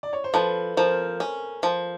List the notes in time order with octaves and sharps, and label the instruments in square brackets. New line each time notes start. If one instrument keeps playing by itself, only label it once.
[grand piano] D5
C#5
C5
[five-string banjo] F3 [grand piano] A4 B4
[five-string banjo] F3 [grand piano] A#4 C5
[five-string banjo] C#4
F3